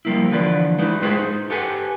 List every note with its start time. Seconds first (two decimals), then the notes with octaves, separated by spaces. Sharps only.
0.05 F3 G3 A#3 E4
0.31 D3 E3 F3 F4 B4 D5
0.78 G#3 D#4 E4 B4
1.02 A2 G#3 F4 G#4 B4 C5
1.18 D#4
1.50 G4 A4 B4 F#5 G#5